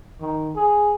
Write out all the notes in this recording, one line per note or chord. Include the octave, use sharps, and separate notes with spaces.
D#3
G#4